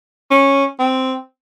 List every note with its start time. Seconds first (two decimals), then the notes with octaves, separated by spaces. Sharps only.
0.31 C#4
0.79 C4